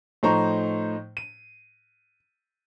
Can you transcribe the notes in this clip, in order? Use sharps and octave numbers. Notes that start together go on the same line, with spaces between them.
A2 F3 D#4 C5 A#5 C#6
D#7